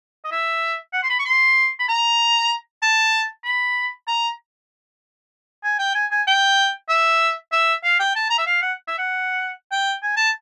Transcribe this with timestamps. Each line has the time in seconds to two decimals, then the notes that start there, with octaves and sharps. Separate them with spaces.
0.25 D#5
0.32 E5
0.93 F#5
1.03 C6
1.10 B5
1.19 C#6
1.26 C6
1.80 B5
1.89 A#5
2.82 A5
3.44 B5
4.08 A#5
5.64 G#5
5.79 G5
5.95 G#5
6.11 G#5
6.27 G5
6.89 E5
7.52 E5
7.84 F5
8.00 G5
8.16 A5
8.30 A#5
8.38 E5
8.47 F5
8.62 F#5
8.88 E5
8.99 F#5
9.72 G5
10.03 G#5
10.17 A5